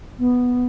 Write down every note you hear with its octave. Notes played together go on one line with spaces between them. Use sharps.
B3